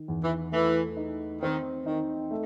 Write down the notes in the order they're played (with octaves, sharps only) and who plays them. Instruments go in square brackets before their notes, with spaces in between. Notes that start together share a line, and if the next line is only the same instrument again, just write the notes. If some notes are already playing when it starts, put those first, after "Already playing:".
Already playing: [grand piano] D#3
E2
[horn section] E3
[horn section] E3 [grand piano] A3
[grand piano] D#4
[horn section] D#3 [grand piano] C4
[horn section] D#3 [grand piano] D#4
[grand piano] A3